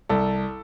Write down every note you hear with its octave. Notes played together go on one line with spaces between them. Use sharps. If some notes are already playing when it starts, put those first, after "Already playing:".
C2 A4